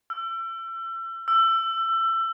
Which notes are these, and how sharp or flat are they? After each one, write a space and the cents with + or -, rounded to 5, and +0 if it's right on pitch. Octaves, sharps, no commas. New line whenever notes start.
E6 +35
E6 +25